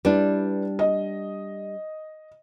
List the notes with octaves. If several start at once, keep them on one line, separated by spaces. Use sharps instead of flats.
G3 D4 E4 B4
D#5